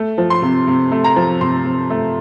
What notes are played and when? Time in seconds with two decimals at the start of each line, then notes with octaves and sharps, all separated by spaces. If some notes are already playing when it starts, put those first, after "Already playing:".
Already playing: A3
0.18 F3
0.30 C6
0.42 C3
0.67 C3
0.92 A3
1.04 A#5
1.16 F3
1.41 C3 C6
1.65 C3
1.90 A3